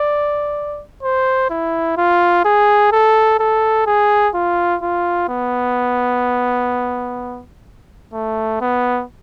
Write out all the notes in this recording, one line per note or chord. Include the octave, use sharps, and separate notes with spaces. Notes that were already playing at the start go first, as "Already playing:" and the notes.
Already playing: D5
C5
E4
F4
G#4
A4
A4
G#4
F4
F4
B3
A3
B3